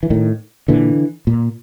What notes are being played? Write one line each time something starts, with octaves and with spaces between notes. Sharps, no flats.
E3
A2 D#3
A#2 D3 E3
A#2